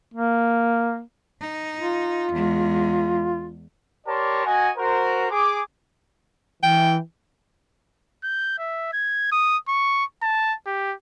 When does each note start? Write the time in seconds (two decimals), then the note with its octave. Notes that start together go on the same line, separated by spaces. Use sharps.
0.14 A#3
1.40 D#4
1.77 F4
2.32 E2 G#3
4.06 G4 A#4 C#5 D5 A5 C6
4.46 F#4 D#5 F#5 G#5
4.77 F#4 A#4 C5
5.31 G#4 D6
6.63 E3 G5
8.23 G6
8.58 E5
8.93 G#6
9.32 D#6
9.68 C#6
10.22 A5
10.67 G4